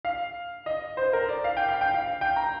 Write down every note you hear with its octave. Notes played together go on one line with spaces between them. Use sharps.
F5
D#5
C5
A#4
D5
F5
G5
F5
G5
F5
G5
A#5